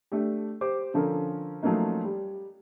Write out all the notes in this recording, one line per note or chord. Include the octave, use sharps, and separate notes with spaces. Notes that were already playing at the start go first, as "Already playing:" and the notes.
A3 D4 G4
G4 C5 D6
D3 F3 C#4 A4 A#4
F3 F#3 A3 A#3 C#4 D#4
G3